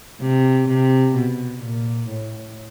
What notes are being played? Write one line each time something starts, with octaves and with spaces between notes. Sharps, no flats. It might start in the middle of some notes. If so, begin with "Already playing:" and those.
C3
C3
B2
A#2
A2